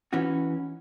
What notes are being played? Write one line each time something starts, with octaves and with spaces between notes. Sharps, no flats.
E3 C#4 D#4 F#4